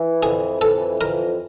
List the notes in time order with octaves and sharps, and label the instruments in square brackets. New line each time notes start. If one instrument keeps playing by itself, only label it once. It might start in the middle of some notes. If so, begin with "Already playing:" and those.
Already playing: [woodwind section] E3
[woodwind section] F2 [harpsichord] G#4
[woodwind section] E3 [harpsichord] A4
[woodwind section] F2 [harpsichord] A#4